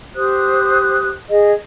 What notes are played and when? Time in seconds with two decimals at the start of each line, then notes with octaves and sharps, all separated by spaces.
0.14 G4 C5 D#6 F#6
1.30 G#4 D#5